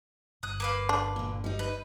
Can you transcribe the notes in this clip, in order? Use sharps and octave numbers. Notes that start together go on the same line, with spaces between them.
G1 D#6 F#6
A#3 B4 F5
D4
A#2 D3
G3 D#4
B4